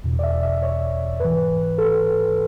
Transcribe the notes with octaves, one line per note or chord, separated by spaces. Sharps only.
E2 B2
D5
E5
E5
C#5
G#2 E3 B4
A4